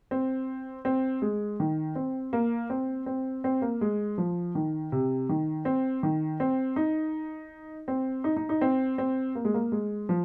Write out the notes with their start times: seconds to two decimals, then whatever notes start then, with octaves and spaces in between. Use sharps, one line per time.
0.11 C4
0.85 C4
1.22 G#3
1.60 D#3
1.95 C4
2.33 A#3
2.70 C4
3.06 C4
3.44 C4
3.62 A#3
3.81 G#3
4.18 F3
4.55 D#3
4.92 C3
5.29 D#3
5.65 C4
6.03 D#3
6.40 C4
6.76 D#4
7.88 C4
8.24 D#4
8.37 D#4
8.49 D#4
8.61 C4
8.98 C4
9.35 A#3
9.45 G#3
9.54 A#3
9.72 G#3
10.09 F3